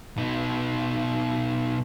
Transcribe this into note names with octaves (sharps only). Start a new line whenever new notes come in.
B2 D#4